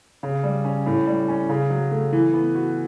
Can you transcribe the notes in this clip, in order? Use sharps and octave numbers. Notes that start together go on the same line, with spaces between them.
C#3
G3
C#4
A2
G3
C#4
C#3
F#3
A3
E3
B3
F#4